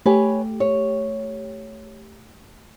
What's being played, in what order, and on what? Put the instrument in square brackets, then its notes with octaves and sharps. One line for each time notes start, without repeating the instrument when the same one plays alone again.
[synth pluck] A3 G4 [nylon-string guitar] B4 C#5 G#5
[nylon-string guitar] C#5